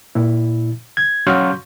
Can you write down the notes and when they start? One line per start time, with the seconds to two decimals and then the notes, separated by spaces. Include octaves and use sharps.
0.15 A#2 E4
0.97 G#6
1.27 F#3 C#4 F5 C6 C#6 G6